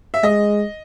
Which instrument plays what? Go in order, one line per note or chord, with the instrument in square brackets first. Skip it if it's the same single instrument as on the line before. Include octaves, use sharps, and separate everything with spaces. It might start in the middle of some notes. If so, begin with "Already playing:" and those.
[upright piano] E5
[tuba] G#3 [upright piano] D#5